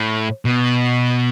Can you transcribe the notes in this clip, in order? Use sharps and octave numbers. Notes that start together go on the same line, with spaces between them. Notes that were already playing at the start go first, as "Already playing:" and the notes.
Already playing: A2
B2